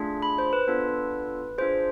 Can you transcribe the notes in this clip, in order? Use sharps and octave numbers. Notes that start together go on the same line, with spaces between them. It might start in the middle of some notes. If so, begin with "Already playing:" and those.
Already playing: A3 D4 F4 G#4
B5
C5
B4
B3 D4 F4 A4
D4 F4 G#4 C5